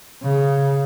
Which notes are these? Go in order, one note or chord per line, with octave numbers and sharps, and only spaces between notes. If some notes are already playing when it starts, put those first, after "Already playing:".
C#3